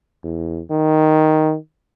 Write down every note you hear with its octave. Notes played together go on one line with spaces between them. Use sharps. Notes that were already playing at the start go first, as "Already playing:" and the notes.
E2
D#3